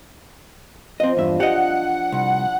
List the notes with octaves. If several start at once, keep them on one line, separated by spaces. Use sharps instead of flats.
F3 C4 D#5
E2 G2 D4 E5
G4 D#5 F#5
C2